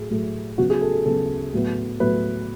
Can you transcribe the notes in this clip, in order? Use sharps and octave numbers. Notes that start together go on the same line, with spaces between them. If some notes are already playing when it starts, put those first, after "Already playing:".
Already playing: A2 F#3 A3 G#4
A2 F#3 A3
C#3 F#3 B3 F#4
G#4
A4
A4
C#3 F#3 B3 A4
A2 F#3 B3
A2 F#3 B3 B4